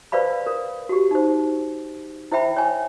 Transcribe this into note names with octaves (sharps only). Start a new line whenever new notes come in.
B4 C5 D5 F5 B5
A#4
F#4 G4
D#4 C5
E4 C5 E5 G5 B5
C#5 G#5